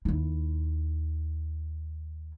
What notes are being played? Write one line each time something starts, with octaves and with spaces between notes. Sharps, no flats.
D#2 E4